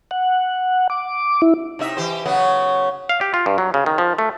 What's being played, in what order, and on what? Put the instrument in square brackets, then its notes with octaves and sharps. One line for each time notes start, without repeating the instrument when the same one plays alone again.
[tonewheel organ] F#5
D6
E4
[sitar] C3 D#4 E5
E3 G4 C5
C#3 F#3 B3
[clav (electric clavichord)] F5
G4
F4
G2
F#3
C#3
D#3
F3
A3